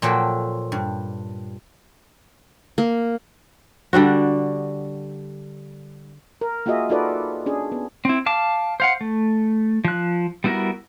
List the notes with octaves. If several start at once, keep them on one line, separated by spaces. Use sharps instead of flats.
A#2 F3 F#3 F#4 A4 G5
G2
A#3
D3 G3 D4 F#4
A#4
A#3 F4 F#4 G#4 D#5 E5
D#4 F4 F#4 A4 B4 D5
C#4 D4 G#4
B3
C4 E4
F5 A5 D6
C5 F5 F#5
A3
F3 F#6
G3 B3 E4 F#4 A#4